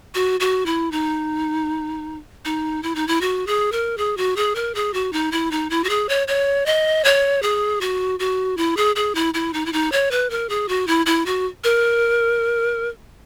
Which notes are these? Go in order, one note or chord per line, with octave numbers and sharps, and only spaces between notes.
F#4
F#4
E4
D#4
D#4
E4
D#4
E4
F#4
G#4
A#4
G#4
F#4
G#4
A#4
G#4
F#4
D#4
E4
D#4
E4
F#4
G#4
C#5
C#5
D#5
C#5
G#4
F#4
F#4
E4
G#4
G#4
E4
E4
D#4
E4
D#4
C#5
B4
A#4
G#4
F#4
E4
E4
F#4
A#4